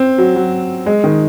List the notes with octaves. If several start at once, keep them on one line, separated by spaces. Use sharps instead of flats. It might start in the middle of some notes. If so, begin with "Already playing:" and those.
Already playing: C4
F#3
F#3
G#3
D#3